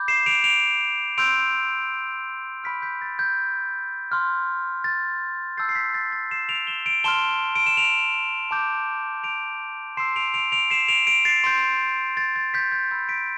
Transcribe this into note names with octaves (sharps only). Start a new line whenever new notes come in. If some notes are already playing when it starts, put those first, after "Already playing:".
Already playing: B5 D6 G6
C7 E7
D7 F7
D7 F7
C6 E6 G6 D7 F7
B5 F6 B6 D7
G6 B6
A6
G6
C6 F6
A6
A5 E6 G6 A6 C7
C7
G6 B6
A6
A6
C7 E7
D7 F7
E7 G7
D7 F7
A5 C6 F6 E7 G7
D7
E7
D7 F7
A5 D6 G6
D7 F7
C6 E6 G6 C7 E7
D7 F7
D7 F7
D7 F7
C7 E7
D7 F7
D7 F7
A6 C7
C6 G6
A6
A6
G6 B6
G6
B5 E6 G6
B6 D7